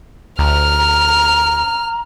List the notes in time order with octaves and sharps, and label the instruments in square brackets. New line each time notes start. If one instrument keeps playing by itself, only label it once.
[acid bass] D2 [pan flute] A#5 [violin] F6